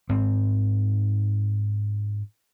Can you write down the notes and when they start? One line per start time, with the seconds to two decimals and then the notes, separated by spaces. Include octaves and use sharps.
0.09 G#2 C4